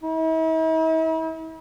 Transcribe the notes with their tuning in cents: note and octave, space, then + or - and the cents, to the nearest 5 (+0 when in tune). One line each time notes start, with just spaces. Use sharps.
E4 -45